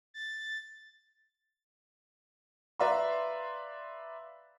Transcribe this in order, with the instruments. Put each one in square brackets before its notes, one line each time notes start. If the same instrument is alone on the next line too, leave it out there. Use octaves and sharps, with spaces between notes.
[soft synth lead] A6
[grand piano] B4 D5 E5 F5 A#5 C6